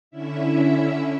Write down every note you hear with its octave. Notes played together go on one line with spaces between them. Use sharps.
D3 C#4 E4 E5